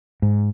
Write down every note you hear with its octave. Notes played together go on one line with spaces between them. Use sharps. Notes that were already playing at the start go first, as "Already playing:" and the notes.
G#2